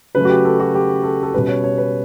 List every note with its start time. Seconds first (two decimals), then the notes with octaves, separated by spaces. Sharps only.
0.15 C#3 F#3 A3 B4
0.25 F#4
0.30 G4
0.45 A4
0.60 F#4
0.74 G4
1.03 A4
1.23 A4
1.34 B2 G3 C#4 B4
1.48 C#5
1.64 C#5
1.78 B4